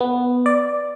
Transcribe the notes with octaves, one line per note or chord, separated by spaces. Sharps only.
B3
D5